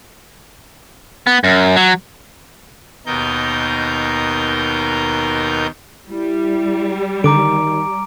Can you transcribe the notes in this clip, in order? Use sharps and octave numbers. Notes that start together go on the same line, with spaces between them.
B3
F#2
F#3
D#2 B2 D#4 A#4 G6
G3 E4
D3 D#3 A#5 D6 D7